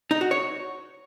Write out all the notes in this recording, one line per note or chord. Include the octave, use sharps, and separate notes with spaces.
D#4
F#4
C#5